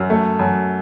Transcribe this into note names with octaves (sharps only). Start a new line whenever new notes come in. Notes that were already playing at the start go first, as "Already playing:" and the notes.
Already playing: F#2
A3
F#2